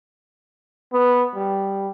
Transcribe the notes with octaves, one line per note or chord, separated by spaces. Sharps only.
B3
G3